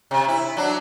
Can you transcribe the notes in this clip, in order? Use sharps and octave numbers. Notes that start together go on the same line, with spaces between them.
C3
E4
F#3 D4